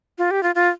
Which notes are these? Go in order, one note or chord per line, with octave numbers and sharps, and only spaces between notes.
F4
G4
F4
F4